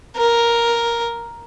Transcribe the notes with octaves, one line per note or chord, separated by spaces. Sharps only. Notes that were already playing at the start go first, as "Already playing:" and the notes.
A#4